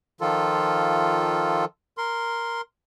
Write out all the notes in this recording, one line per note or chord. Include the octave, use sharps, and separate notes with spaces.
D#3 F3 F4 A4
A#4 C6